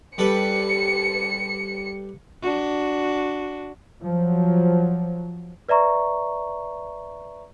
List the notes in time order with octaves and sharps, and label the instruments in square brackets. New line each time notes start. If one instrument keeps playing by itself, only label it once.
[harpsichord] G3 A4 B4 [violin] C#7
[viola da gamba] D4 F#4
[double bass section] F3 F#3
[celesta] B4 D5 E5 A#5 C#6